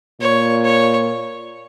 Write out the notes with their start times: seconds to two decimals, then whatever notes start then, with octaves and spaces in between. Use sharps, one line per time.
0.21 A#2 C#5
0.64 C#5